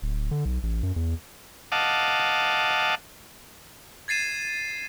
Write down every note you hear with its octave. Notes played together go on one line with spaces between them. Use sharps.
D1
D3
B1
A1
F#2
E2
D#5 F5 F#5 A5 D6
G#6 A6 C7 D#7 E7